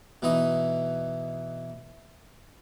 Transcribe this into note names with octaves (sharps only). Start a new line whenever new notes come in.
B2 E3 D#4 D#6